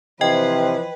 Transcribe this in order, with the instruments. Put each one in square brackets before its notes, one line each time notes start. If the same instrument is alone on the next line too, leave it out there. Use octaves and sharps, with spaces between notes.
[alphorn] C3 [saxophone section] E3 F3 [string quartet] B4 [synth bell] D#5 G5